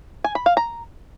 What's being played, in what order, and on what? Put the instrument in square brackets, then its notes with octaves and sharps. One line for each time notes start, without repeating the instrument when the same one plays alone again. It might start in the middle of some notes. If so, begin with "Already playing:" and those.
[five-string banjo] G#5
B5
F5
A#5